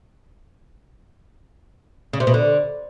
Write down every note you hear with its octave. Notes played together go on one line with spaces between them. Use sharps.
C#3
C3
B2
D3